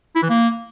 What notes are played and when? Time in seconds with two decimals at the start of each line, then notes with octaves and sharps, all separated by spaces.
0.15 E4
0.22 E3
0.29 A#3